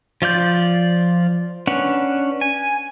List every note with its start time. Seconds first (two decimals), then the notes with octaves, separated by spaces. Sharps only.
0.22 F3 F4 D5 G6
1.67 C#4 D4 B4 F#5
2.41 G#5